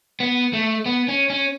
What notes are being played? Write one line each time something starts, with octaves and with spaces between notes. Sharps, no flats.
B3
A3
B3
C#4
C#4